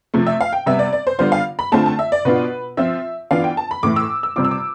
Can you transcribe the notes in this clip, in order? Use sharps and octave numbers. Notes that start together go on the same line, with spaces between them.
C3 F3 A3
E5
F5
G5
C3 G3 B3 E5
D5
D5
C5
D3 G3 B3 F4 C5
F5
B5
D3 A3 C4 F4 A5
A5
E5
D5
B2 B3 D4 F4 B4
F3 C4 F4 E5
E3 B3 D4 F4 F5
G5
A5
B5
A2 E3 A3 E4 D6
E6
E6
C3 G3 C4 F4 D6
E6
D6